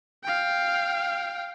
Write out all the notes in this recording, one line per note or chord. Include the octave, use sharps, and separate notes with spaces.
F5 G5